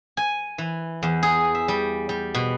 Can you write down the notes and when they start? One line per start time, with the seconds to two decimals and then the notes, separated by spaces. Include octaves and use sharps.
0.17 G#5
0.58 E3
1.03 E2
1.23 G#4
1.55 E5
1.68 G3
2.09 G3
2.35 B2